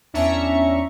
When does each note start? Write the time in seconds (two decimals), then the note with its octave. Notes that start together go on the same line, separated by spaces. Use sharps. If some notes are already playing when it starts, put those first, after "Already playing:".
0.13 E2 C#4 D4 E5 A#5 C#6